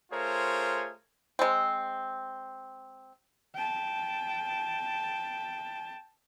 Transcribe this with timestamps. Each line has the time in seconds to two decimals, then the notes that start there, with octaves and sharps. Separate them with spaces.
0.12 A3 F4 G#4 A#4 C5 C#5
1.39 G#3 C4
3.55 G5 A5